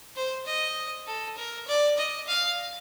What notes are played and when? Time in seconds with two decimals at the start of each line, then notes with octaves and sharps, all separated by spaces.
0.16 C5
0.46 D#5
1.06 A4
1.37 A#4
1.67 D5
1.98 D#5
2.28 F5